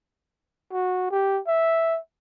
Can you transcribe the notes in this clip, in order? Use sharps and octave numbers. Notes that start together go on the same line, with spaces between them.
F#4
G4
E5